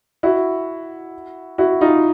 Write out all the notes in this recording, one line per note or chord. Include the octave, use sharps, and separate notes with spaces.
E4 F#4
E4 F#4
D#4 F4